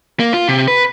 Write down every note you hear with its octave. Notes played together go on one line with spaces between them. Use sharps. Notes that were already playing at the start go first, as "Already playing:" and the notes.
A#3
F4
C3
B4